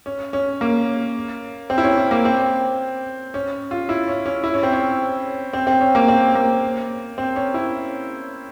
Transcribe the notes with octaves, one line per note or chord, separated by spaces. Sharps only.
C#4
C#4
A#3
C4
E4
C#4
C#4
A#3
C4
C#4
F4
E4
C#4
C#4
E4
C#4
C4
C#4
C4
C4
C#4
A#3
C4
A#3
C4
C#4
E4